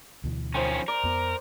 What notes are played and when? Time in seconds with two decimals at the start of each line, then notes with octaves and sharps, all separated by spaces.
0.24 D2 B2 E3
0.54 D#3 F3 C#4 C5 G5
0.88 A#4 D5
1.03 F2 B3